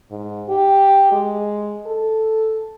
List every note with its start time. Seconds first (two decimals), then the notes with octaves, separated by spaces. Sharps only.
0.11 G#2
0.49 G4
1.12 G#3
1.86 A4